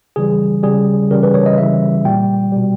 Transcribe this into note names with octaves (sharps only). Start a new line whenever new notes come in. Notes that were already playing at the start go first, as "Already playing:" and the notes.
C#3 E3 G3 G#4
C#3 G3 G#4
C#3 E3 G3 A#4
B4
C#5
D#5
C#3 E3 G3 E5
A#2 G3 G5
B2 G3